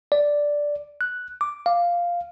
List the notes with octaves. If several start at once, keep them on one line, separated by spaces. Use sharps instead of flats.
D5
F#6
D6
F5